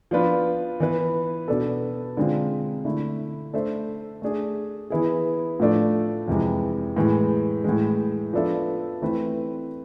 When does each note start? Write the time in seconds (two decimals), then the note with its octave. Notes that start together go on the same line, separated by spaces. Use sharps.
0.11 F3 B3 D4 F4 B4
0.80 E3 B3 E4 B4
1.48 B2 B3 D4 A4
2.17 D3 G#3 C4 F4
2.85 D3 A3 E4
3.53 A3 D4 A4 C5 E5
4.22 A3 D4 G#4
4.90 E3 B3 E4 G#4
5.60 A2 F3 A3 D4 A4
6.28 F2 C3 E3 G#3
6.96 A2 E3 G#3
7.64 A2 E3 G#3
8.33 F3 B3 D4 A4 E5
9.02 E3 A3 C4 E4 B4